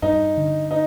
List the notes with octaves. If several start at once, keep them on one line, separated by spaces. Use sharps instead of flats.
G2 D#4
D3
D#4